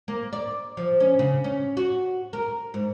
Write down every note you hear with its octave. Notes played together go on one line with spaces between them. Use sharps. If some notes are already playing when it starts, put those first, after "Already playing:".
A#3
D5
F3
C#4
C#3
C#4
F#4
A#4
G#2